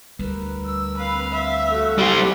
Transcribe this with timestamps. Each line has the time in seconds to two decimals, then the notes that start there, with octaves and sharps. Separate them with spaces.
0.19 D2 G3 A#4 B4
0.66 E6
0.97 C4 B4 F5
1.32 E5
1.68 A3 F#4
1.98 G3 C5